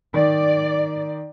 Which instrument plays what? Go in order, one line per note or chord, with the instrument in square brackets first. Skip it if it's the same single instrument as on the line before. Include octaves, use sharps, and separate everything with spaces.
[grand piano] D#3 [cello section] D5